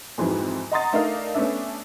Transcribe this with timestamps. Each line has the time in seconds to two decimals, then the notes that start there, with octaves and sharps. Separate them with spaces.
0.18 F2 G#2 E3 F#3
0.72 D#5 F#5 A#5 C6 D#6 A6
0.93 A3 D4 D#4 A#4 D5 F5
1.35 A3 B3 C#4 D4 E5